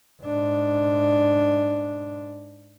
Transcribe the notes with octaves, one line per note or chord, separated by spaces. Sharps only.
G#2 D4